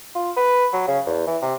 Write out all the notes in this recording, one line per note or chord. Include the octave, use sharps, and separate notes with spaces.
F4
B4
F#3
C#3
E2
E3
C3